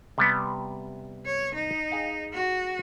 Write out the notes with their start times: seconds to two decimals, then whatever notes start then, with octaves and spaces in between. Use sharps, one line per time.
0.18 C3 G3 B3
1.25 C#5
1.54 D#4
1.90 G#4 F5 G5
2.33 F#4